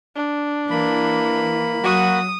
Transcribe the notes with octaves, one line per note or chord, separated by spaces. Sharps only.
D4
E3 A#3 B5
F#3 F#4 D#6